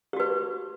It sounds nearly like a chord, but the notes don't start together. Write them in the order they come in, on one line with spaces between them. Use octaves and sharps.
G4 F#4 B4